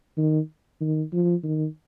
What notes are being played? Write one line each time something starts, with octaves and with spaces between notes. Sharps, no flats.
D#3
D#3
F3
D#3